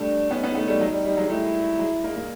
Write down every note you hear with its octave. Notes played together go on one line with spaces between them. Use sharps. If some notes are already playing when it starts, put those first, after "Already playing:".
Already playing: G3 A3 D4
B3 C#4 D#4
B3 C#4
A3 B3
G3 A3
F#3
G3
G3
F#3 G#3
G3 A3 E4
F#3 G#3
G#3 A#3
G#3 A#3